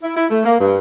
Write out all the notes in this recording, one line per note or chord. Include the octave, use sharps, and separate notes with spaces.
E4
E4
A3
A#3
G2